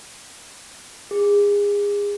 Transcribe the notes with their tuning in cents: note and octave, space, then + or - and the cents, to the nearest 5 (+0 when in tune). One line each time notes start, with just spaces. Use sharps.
G#4 -30